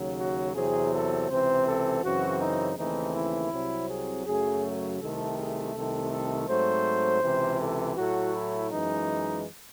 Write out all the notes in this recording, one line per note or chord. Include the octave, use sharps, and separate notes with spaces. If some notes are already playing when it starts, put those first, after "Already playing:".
Already playing: D#2 C#3 F#3
F#4
E2 C3 F#3 C4 G#4
A4
C#2 C3 E3 C4 C5
A4
F#2 C#3 E3 C4 F#4
D#4
D#2 C#3 E3 A3 C4 D#4
E4
C2 C3 F#3 C4
G#4
F#2 C#3 F#3 A3 G#4
C2 C3 D#3 A3 A4
G#4
C2 C3 D#3 A3 A4
A4
G#2 F#3 A3 C4 C5
C#2 C3 E3
A4
A2 F#3 A3 F#4
E4
F#2 E3 G#3 D#4